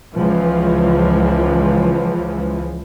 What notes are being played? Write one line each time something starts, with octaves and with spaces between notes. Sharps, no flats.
C#2 E3 F3